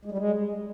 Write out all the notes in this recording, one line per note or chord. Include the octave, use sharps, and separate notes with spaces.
G#3
G3
G#3